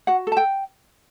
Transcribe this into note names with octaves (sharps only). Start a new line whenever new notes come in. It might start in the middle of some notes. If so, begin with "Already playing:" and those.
F#4 F#5
A4 A5
G5